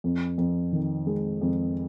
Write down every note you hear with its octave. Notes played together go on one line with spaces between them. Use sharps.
F2
F2
D#3
G#3
F2